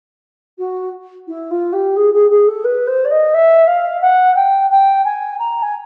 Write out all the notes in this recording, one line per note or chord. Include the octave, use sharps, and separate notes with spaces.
F#4
E4
F4
G4
G#4
G#4
G#4
A4
B4
C5
D5
D#5
E5
F5
F#5
G5
G5
G#5
A#5
G#5